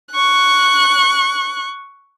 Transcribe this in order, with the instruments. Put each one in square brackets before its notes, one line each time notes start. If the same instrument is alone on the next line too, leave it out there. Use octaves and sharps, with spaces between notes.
[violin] C#6 F#6